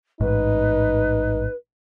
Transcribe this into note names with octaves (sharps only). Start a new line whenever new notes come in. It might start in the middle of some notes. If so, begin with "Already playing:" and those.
A1 G#2 D#4 B4